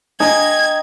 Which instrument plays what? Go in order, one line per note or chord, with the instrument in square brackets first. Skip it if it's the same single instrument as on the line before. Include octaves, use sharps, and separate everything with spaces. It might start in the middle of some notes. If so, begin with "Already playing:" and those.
[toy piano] D4 [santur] D#5 G5 A#5 [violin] G#6